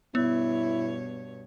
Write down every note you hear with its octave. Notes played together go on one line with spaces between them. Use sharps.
G2 B2 B3 E4 C#5